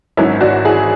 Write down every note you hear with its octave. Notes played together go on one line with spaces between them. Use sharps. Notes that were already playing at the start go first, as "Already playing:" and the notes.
G#1 G#2 F#3 C#4 E4
D4 F#4
E4 G#4